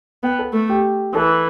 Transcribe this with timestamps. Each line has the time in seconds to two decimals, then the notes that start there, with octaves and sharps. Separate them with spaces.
0.23 B3 G5
0.39 A4
0.53 A3
0.69 G4
1.15 E3 A4